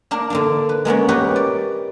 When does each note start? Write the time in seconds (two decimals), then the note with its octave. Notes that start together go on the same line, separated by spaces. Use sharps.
0.11 A#3 D4 A#4
0.30 D3 A#3 D4
0.69 B4
0.85 G#3 A#3 B3 C#4
1.08 G4 A#4 B4 C#5 D#5
1.36 D5